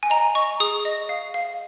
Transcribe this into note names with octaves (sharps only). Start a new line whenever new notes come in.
G#5
D#5 A#5
D#5 C#6
G#4 D#6
D#5
F5
F5